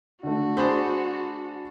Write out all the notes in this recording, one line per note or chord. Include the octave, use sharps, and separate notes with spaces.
D3 A3 F#4
D4 G#4 C5 B5